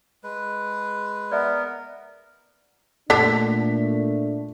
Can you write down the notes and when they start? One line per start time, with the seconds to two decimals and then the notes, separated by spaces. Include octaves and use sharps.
0.23 G#3 B4
1.32 B3 A#4 D5 E5
3.10 A#2 D3 A3 D4 A4 B6